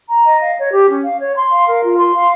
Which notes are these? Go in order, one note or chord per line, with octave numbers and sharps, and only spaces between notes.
A#5
D#5
F5
C#5
G4
C#4
F5
C#5
C6
F5
A#4
F4
C6
F5